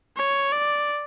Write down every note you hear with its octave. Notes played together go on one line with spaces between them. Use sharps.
C#5
D5